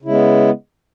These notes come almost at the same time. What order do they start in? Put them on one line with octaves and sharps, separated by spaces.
C#3 E4 G#3 B3